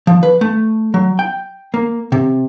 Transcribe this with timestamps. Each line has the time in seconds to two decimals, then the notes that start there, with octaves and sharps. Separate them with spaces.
0.07 F3
0.23 B4
0.41 A3
0.94 F#3
1.19 G5
1.74 A#3
2.12 C3